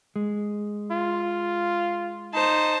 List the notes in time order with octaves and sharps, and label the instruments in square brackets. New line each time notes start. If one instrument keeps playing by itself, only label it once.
[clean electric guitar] G#3
[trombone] F4
[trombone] D#4 [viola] C5 A5